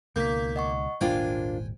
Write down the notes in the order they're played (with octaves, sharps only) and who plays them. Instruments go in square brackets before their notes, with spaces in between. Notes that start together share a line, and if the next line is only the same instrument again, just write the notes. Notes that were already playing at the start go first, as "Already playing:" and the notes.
[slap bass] C#2 B2 D#3 [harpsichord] A#3 [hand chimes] G6 B6
[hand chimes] D#5 F#5 C#6
[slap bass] D#1 G#1 [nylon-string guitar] A#3 D4 F4 [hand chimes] C5 [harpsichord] G5 G#5